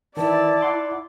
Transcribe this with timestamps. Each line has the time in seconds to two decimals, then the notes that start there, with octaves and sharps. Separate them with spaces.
0.17 D#3 E3 E4 D5 A5
0.61 F#5 C6 D6